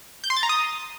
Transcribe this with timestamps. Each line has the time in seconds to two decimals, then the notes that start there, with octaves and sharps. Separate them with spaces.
0.24 G6
0.30 C6
0.37 A6
0.43 A#5
0.49 D#6